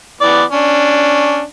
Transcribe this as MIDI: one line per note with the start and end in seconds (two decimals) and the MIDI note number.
0.21 0.43 52
0.21 0.43 59
0.21 0.43 74
0.52 1.43 61
0.52 1.43 62